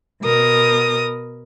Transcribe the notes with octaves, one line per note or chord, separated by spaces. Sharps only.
B2 A#4 D#6